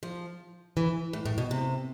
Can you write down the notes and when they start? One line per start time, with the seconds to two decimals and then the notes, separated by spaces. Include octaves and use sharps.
0.03 F3
0.77 E3
1.13 A2
1.26 A2
1.38 B2
1.51 C3